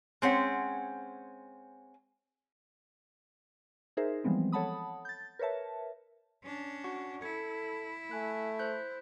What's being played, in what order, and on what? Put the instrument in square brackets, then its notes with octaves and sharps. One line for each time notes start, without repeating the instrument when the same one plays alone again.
[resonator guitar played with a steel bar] G#3 C4 C#4 F#5
[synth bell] D#4 G#4 A#4 C5 E5
E3 F3 G3 G#3 B3 C4
A4 C#5 F#5 A5 B5 D#6
G6 A6
A#4 B4 C#5 E5 A5
[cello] C#4 D4
[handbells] F#4 F#5 C#6
[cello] E4 [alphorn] A4 [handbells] G#6 C#7
[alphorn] A3 [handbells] G#5 F#6
[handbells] C5 F#6 G6